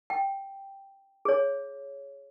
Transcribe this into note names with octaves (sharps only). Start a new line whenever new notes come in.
G5
G#4 C#5